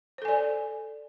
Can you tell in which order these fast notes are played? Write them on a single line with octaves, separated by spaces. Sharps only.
C5 A4 G#5 D5